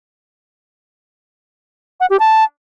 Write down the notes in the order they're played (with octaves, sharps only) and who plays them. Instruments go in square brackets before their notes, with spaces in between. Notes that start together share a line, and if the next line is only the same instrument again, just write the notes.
[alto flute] F#5
G4
A5